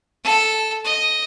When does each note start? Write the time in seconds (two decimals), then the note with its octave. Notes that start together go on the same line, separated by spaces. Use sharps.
0.24 A4
0.85 D#5